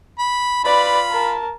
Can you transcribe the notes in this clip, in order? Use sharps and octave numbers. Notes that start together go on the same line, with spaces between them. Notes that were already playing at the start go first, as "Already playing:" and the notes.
B5
F4 B4 D5 B5
A#4 A5